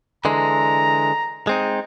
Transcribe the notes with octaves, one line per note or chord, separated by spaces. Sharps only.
D3 E3 G#3 A#5
G#3 C4 D#4